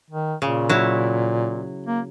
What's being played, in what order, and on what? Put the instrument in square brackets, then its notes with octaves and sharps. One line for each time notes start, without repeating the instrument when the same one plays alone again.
[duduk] D#3
[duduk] A#2 [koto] C#3
[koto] F#3 E4
[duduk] A#3